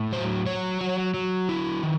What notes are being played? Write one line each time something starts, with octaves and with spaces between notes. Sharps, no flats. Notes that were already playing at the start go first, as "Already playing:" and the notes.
Already playing: A2
F#3 C5
F#3 C#5
F#3
F#3
E4
D#3